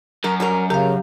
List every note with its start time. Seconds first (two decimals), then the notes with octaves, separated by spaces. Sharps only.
0.24 F#2 A#4
0.40 F#3 G3 A#4
0.70 C#3 G4 A#4 F5